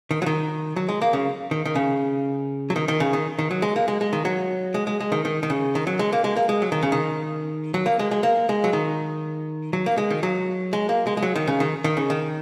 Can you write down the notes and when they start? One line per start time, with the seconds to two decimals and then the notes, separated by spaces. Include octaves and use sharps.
0.11 D#3
0.22 F#3
0.26 D#3
0.76 F#3
0.89 G#3
1.02 A#3
1.13 C#3
1.51 D#3
1.66 D#3
1.75 C#3
2.70 F#3
2.76 D#3
2.88 D#3
3.00 C#3
3.13 D#3
3.39 D#3
3.51 F#3
3.62 G#3
3.76 A#3
3.88 G#3
4.01 G#3
4.13 D#3
4.25 F#3
4.74 G#3
4.87 G#3
5.00 G#3
5.12 D#3
5.25 D#3
5.43 D#3
5.50 C#3
5.75 D#3
5.87 F#3
5.99 G#3
6.13 A#3
6.24 G#3
6.37 A#3
6.49 G#3
6.62 F#3
6.72 D#3
6.83 C#3
6.92 D#3
7.74 F#3
7.86 A#3
7.99 G#3
8.11 G#3
8.23 A#3
8.49 G#3
8.64 F#3
8.73 D#3
9.73 F#3
9.86 A#3
9.98 G#3
10.10 D#3
10.23 F#3
10.73 G#3
10.89 A#3
11.07 G#3
11.17 G#3
11.23 F#3
11.36 D#3
11.47 C#3
11.60 D#3
11.84 D#3
11.97 C#3
12.10 D#3